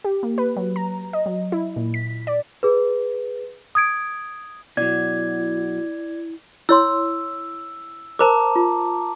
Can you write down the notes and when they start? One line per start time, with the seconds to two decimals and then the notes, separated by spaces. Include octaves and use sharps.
0.04 G4
0.23 A#3
0.38 B4
0.57 F#3
0.76 A#5
1.13 D#5
1.26 F#3
1.52 E4
1.76 A#2
1.94 B6
2.27 D5
2.63 G#4 B4
3.75 D#6 G#6 D7
4.77 B2 F#3 E4 D5 G#6
6.69 E4 C#5 C6 E6
8.19 A#4 C5 A5 A#5 D6
8.56 F4